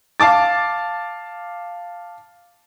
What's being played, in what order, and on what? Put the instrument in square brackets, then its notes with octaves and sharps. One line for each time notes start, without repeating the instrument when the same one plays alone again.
[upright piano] F5 A5 D6 A6